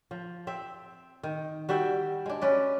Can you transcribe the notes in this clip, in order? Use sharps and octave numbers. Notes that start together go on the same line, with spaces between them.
F3
C4 E5
D#3
G3 F#4 E5 G5
G#3 D4
C#4 B4 D5